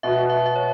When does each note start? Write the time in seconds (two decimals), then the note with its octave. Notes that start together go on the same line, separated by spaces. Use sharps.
0.03 B2 B3 F#4 E5
0.30 E5
0.46 E5
0.56 C#5